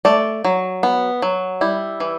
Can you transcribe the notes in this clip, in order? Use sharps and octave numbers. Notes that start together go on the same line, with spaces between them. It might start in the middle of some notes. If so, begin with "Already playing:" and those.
A3 D5
F#3
B3
F#3
G3 E4
E3